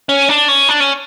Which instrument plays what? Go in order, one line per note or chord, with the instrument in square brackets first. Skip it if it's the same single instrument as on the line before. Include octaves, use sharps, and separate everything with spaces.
[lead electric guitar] C#4
D4
C#4
D4
C#4